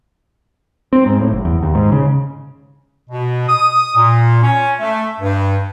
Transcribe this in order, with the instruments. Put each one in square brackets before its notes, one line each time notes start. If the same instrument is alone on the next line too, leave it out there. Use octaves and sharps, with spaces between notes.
[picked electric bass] C4
G#2
A2
F#1
E2
D#2
G#2
C#3
[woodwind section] B2
D#6
A#2
C#4
A3
G2